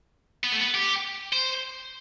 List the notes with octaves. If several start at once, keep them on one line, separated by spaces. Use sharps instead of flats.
B3
A3
B3
G4
C5